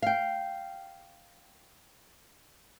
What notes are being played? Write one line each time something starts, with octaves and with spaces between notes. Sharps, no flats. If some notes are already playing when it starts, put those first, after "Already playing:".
F5 G5